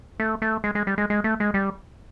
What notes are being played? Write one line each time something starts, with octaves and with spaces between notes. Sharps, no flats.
A3
A3
G#3
G#3
G3
G#3
G#3
A3
G#3
G3